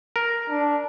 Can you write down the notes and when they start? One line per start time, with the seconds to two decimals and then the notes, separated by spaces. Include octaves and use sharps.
0.16 A#4
0.49 D4